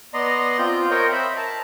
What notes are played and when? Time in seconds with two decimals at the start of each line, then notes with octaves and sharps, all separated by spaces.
0.14 B3 D5 D#5 A#5 C6
0.59 C4 F4 G6
0.91 A#4 C5 C#5 D#5 G5
1.12 C5 E5 B5
1.37 A5 A#5